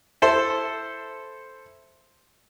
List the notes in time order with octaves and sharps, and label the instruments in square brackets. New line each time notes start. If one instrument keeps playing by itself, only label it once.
[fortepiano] E4 A4 C5